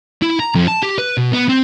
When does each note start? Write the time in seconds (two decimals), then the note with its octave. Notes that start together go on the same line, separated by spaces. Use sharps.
0.22 E4
0.40 A#5
0.55 F2
0.68 A5
0.83 G4
0.98 B4
1.18 B2
1.33 B3
1.49 C4